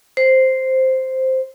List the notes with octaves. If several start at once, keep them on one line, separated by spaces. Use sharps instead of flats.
C5